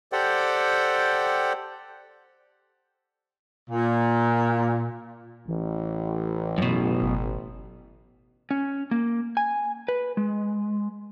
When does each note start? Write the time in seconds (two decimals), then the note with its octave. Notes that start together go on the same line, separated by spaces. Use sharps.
0.12 G4 A4 C5 D5 F#5 G5
3.70 A#2
5.48 A1 E3
6.58 F#2 B2
7.02 G1
8.51 C#4
8.91 A#3
9.37 G#5
9.88 B4
10.17 G#3